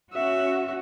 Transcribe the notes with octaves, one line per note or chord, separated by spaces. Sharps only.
C#4 F#4 E5